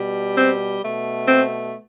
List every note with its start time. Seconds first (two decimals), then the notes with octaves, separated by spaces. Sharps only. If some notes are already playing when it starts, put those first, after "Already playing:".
Already playing: B2 G3
0.37 C4
0.83 B2 A3
1.28 C4